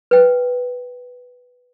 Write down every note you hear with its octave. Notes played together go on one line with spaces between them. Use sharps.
B4 G5